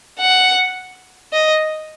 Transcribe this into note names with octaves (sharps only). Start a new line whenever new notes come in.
F#5
D#5